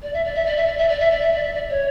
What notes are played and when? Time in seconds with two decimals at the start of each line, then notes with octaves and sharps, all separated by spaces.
0.03 D5
0.14 E5
0.24 D5
0.35 E5
0.46 D5
0.57 E5
0.67 D5
0.78 E5
0.89 D5
1.00 E5
1.11 D5
1.22 E5
1.33 D5
1.43 E5
1.54 D5
1.70 C#5